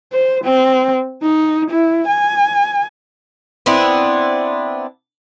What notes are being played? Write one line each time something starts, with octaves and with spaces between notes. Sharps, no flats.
C5
C4
D#4
E4
G#5
B3 C4 D4 E4